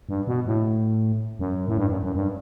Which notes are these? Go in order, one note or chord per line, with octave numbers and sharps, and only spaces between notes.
G2
B2
A2
F#2
A2
G2
F#2
F#2
G2